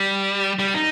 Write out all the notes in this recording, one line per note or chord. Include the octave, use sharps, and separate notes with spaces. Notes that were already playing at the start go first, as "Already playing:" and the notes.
Already playing: G3
G3
D#4